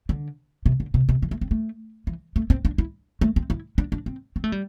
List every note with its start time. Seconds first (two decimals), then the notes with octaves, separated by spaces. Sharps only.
0.09 D3
0.66 C3
0.80 D3
0.94 C3
1.09 C3
1.22 E3
1.31 A3
1.41 C4
1.51 A3
2.07 E3
2.36 A3
2.50 C4
2.65 D4
2.78 E4
3.21 A3
3.36 C4
3.50 E4
3.78 D4
3.92 D4
4.06 C4
4.36 C4
4.44 A3
4.52 G3